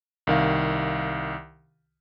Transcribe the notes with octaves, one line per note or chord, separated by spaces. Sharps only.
C2 D#3 F5